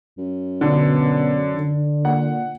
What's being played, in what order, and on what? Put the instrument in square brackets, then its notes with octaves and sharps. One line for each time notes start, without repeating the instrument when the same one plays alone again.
[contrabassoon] F#2
[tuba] B2 [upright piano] D3
[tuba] D3
[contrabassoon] A#2 [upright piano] F#5